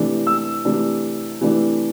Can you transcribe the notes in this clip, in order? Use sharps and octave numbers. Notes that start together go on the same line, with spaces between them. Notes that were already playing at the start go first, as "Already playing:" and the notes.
Already playing: C3 E3 A3 D4
E6
C3 E3 A3 D4
C3 E3 A3 D4